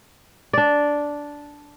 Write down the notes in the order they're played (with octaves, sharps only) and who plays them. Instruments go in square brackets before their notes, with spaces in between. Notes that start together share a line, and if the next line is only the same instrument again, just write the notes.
[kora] D4 D5